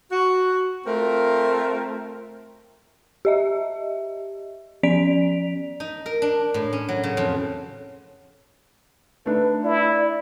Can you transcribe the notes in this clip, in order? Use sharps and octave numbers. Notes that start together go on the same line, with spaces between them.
F#4
A3 C4 F4 A#4
G4 D#5 E5
F3 C#4 D5 B6 D7 F7
D#4
A#4
D4
A2
C#4
F#3
C#3
F2
A3 D4 D#4 B4
E4 D5